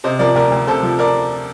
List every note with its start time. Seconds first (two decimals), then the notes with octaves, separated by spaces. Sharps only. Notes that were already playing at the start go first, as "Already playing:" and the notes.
0.04 C3 C5 D#5
0.19 F3 A#4 D5
0.35 D2 A#4 D5
0.51 D2
0.67 C3 A4 C5
0.83 F3
0.99 A#4 D5